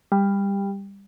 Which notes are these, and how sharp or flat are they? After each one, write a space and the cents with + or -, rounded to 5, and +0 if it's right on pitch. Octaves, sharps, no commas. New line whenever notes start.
G3 +20